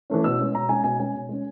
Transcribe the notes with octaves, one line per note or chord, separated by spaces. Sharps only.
E3 A3 C#4
B2 E6
G#3 C#4
B2 A#5
G#3 C#4 G#5
B2 G#5
G#3 C#4 G#5
B2
G#3 C#4